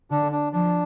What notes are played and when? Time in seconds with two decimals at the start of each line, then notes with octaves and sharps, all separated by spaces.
0.11 D3 D4
0.32 D4
0.53 F3 D4